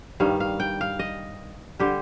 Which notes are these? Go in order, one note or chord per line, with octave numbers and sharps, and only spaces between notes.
G2 D#3 G3 F5
F5
G5
F5
D#5
D3 G3 G4